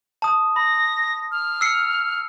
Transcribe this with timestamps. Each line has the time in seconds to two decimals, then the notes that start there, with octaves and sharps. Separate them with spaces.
0.22 A5 D#6
0.56 B5 A#6
1.32 F6
1.61 E6 C7 C#7